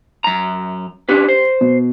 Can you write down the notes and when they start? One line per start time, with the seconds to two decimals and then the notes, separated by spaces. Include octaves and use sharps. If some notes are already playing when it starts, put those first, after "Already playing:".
0.24 F#2 A#5
1.09 C#4 D4 G4 B4
1.28 C5
1.61 B2